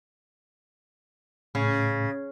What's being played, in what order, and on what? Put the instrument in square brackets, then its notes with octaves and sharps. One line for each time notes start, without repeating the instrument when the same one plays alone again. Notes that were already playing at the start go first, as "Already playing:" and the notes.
[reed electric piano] A2 [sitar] C#3